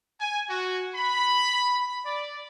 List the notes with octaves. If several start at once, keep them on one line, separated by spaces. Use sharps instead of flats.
G#5
F#4
B5
D5